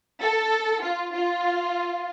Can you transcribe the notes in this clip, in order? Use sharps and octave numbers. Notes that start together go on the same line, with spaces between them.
A4
F4
F4